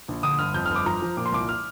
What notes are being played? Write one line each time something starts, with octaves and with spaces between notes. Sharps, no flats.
A#1
D3 D#6
G1 F6
F2 G6
G1 F6
D6
F3 A#5
F3
A#2 D6
C6
C2 D6
F6